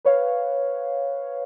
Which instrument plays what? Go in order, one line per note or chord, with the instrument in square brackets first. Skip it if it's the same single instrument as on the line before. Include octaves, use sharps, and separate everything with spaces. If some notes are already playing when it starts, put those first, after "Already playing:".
[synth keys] B4 C#5 F5